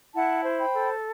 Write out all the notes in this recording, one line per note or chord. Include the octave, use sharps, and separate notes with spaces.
E4 F#5 A5
C5
G5 B5
A4